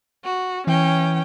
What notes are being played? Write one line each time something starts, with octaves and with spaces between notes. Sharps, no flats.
F#4
E3 C#4 G5